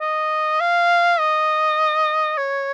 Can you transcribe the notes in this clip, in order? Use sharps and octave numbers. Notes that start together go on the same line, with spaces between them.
D#5
F5
D#5
C#5